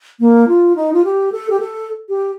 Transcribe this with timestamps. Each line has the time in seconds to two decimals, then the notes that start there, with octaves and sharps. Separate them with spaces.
0.20 A#3
0.48 F4
0.76 D#4
0.93 F4
1.04 G4
1.32 A4
1.50 G4
1.60 A4
2.09 G4